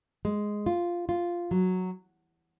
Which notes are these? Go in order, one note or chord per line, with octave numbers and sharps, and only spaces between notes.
G#3
F4
F4
F#3